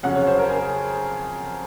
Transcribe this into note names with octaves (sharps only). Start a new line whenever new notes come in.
F2 C#3 F#3 C#4 F#5
C#5
C5
A#4
G#4